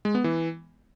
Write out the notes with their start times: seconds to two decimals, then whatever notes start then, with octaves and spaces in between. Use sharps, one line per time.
0.05 G#3
0.15 B3
0.24 E3